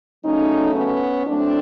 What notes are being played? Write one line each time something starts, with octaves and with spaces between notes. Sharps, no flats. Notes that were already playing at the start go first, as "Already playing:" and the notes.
C#3 F#3 A3 C#4 D#4
B3 C#4
A2 F#3 A3 C4 D4